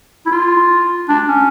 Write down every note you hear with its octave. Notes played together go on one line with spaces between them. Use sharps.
E4
F4
D4
C#4